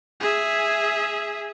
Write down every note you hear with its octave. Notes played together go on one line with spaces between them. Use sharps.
G#4 E5